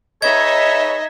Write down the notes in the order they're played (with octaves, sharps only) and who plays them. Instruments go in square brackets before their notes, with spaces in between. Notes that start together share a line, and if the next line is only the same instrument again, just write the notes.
[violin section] D#4 E5 [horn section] G#4 B4 C#5 [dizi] D#5 [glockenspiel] G#6